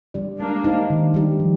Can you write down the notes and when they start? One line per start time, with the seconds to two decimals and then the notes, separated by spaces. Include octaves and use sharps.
0.14 G3 D4 G4 D5
0.39 G#3 A#3 D4
0.64 D#4 G4 C5
0.90 D#3
1.14 G3 D4 G4
1.40 F3